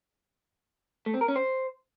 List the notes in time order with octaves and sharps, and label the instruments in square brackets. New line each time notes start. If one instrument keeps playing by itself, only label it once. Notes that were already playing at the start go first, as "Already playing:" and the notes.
[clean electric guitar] A3
C4
A#4
C#4
C5